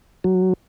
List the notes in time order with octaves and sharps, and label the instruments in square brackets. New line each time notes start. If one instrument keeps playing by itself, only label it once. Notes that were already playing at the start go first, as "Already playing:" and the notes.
[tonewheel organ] F#3